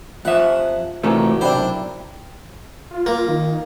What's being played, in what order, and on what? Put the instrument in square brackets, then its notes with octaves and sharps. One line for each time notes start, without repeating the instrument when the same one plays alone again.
[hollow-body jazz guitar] F2 E5 [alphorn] F3 [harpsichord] F#5
[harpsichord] A1 [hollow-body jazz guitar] C3 A3 [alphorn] F#4 [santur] A#4 D5 G#5
[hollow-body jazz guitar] B1 C3 [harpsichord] D4 C5 [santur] E4 G5
[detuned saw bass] F4
[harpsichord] A#3
[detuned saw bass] D#3